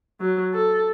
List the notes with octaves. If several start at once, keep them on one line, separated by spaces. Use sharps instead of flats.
F#3
A4